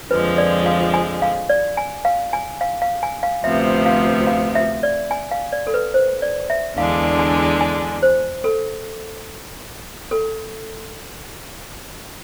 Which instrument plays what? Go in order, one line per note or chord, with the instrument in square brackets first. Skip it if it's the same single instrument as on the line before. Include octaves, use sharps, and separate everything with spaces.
[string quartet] F2 D3 F3 G#3 [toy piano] B4
[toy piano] D5
F5
G#5
F5
D5
G#5
F5
G#5
F5
F5
G#5
F5
[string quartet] D2 C3 F3 B3 [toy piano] E5
[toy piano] F5
F5
E5
D5
G#5
F5
D5
A4
B4
C5
D5
E5
[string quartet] E2 D3 G#3 D4 [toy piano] F5
[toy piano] G#5
G#5
C5
A4
A4